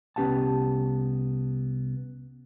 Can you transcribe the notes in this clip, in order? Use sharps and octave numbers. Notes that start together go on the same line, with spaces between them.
C2 B3 C#4 G4 F#5 A5